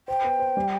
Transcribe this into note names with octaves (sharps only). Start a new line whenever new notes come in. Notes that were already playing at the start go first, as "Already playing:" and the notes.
C5 G5
B3
C5
G3